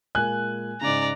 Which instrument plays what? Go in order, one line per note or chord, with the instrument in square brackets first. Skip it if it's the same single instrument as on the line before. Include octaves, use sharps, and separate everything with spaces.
[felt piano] A#2 G#3 A#3 [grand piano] G#5 F#6
[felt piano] G#2 C#3 [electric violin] D5 A#5